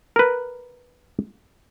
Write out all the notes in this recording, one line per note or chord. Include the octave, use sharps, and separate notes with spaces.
A#4 B4